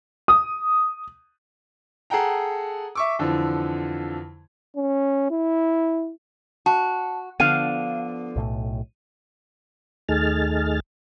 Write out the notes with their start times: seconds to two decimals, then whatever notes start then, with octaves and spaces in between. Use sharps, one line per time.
0.28 D#6
2.10 G#4 A4 F#5 G5 A#5
2.95 E5 C#6 D6
3.19 F2 D3 E3 F3
4.76 C#4
5.31 E4
6.66 F#4 A5
7.40 D3 F3 B3 F5 D#7
8.36 B1 A2
10.09 D#2 A3 D#4 G#4 F6 A6